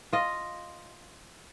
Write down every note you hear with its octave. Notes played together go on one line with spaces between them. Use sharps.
F4 D#5